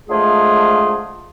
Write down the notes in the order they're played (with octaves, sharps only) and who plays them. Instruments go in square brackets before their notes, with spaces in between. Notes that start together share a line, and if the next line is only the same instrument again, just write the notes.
[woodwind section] D3 F3 G#3 A3 F4 G#4